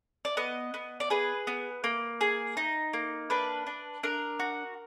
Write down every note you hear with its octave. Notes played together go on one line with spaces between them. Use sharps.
D5
B3 D#5
B3
D5
G#4 B4
B3
A#3
G#4
D#4
A#3
D4 B4
D4
D4 A#4
F#4